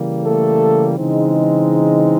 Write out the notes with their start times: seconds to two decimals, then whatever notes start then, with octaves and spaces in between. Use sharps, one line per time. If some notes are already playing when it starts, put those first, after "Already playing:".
Already playing: C#3 E3 G3 A#3
0.23 A3 A4
0.98 C#3 E3 G#3 C4 D#4